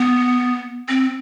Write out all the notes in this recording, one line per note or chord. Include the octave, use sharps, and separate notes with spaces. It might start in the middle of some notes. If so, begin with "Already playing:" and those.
Already playing: B3
C4